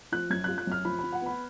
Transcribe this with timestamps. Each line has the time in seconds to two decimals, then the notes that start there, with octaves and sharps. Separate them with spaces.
0.12 F3 F#6
0.30 F#2 G#6
0.44 F4 F#6
0.58 F#6
0.67 F#2 F6
0.85 F3 B5
0.99 F3 B5
1.13 F#5
1.22 B3 B5